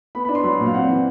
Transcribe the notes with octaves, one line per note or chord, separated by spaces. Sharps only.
B3 B5
D4 B5
C6
F#3 B5
A#2
F5
C4 F#5
E3